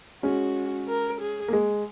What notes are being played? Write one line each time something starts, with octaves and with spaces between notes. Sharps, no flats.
G#3 C#4 F#4
A#4
G#4
A#3
G#3